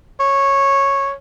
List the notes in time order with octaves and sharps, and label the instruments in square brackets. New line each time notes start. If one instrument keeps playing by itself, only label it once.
[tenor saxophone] C#5